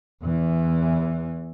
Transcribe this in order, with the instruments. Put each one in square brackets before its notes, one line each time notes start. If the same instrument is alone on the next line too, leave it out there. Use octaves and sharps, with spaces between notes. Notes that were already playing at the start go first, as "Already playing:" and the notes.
[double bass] E2 E3